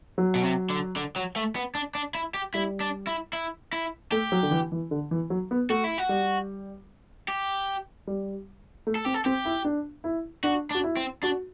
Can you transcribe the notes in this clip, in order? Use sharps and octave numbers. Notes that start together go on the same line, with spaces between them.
F#3
B2
C3
D3
D3
F#3
A3
B3
D4
D4
E4
G4
G3 E4
D4
E4
E4
E4
A3 G4
F#3
D3
E3
E3
D3
E3
F#3
B3
A3 F#4
E4
F#4
G3
G4
G3
A3
A4
C4 G4
A4
C4 G4
E4
D4
E4
D4 F#4
D4
F#4
E4
C4
D4 F#4